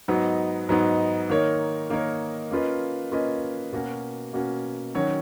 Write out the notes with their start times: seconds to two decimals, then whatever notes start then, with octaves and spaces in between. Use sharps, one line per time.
0.08 G#2 F#3 B3 D#4
0.69 G#2 F#3 B3 D#4
1.30 D#3 A#3 D#4 A#4 C#5
1.90 D#3 A#3 D#4 A#4 C#5
2.51 A#3 C#4 F4 B4 D#5
3.12 A#3 C#4 F4 B4 D#5
3.72 B2 A#3 C#4 F#4
4.33 B2 A#3 C#4 F#4
4.94 D#3 F#3 C#4 F#4 C#5